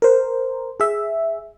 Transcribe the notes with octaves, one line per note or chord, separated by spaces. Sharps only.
A#4 C5
G#4 E5